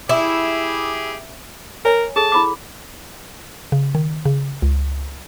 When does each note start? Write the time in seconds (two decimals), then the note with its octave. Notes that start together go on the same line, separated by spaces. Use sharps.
0.09 E4 G4 G#4
1.85 A#4 C#5 G#5
2.16 G#4 A4 A5
2.32 E4 B5 D6
3.72 C#3
3.95 D#3
4.25 C#3
4.62 C#2